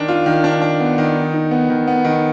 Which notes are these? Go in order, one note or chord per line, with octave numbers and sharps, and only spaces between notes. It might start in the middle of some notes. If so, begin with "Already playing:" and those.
Already playing: D#3 D4
F4
D#3
D4
D4
B3
D#3
D#4
D#4
B3
D#3
B3
D#3